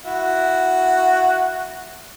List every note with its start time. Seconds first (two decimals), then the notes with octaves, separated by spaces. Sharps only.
0.05 E4 F#4